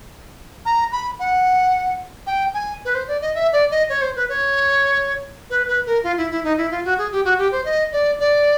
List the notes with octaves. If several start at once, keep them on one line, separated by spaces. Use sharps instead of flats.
A#5
B5
F#5
G5
G#5
B4
C5
D5
D#5
E5
D5
D#5
C#5
C5
B4
C#5
B4
B4
A#4
F4
E4
E4
D#4
E4
F4
F#4
G#4
G4
F#4
G4
C5
D#5
D5
D5